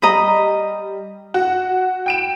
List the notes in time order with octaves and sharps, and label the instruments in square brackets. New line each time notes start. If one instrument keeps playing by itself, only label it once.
[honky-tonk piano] G3 [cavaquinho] D#5 A#5 B5
[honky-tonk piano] F#4
G5 D7 E7